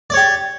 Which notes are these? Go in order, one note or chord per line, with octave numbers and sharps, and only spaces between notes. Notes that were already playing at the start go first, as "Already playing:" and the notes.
G4 C#5 D5